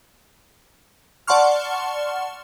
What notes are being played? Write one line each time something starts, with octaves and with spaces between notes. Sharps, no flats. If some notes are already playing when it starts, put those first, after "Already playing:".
D5 F#5 A5 C6 C#6 F6